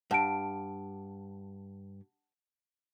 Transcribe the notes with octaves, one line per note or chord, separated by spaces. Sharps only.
G2 F#5 A5 D7